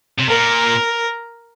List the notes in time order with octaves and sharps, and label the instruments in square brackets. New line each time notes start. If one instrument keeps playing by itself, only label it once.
[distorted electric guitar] C3
[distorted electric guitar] A#2 [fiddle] A#4